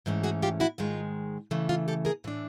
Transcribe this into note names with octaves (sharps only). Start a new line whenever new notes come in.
G#2 E3 A3 C#4
F#4 G#4
F4 G4
E4 F#4
G#2 D#3 G#3 F4
C#3 E3 A3
F4
G4 A4
G#4 A#4
A2 E3 A3 D4